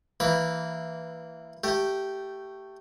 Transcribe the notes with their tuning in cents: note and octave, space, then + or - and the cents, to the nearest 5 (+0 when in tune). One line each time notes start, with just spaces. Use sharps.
E3 +0 A#3 -10 B5 -15
A3 +10 G4 -10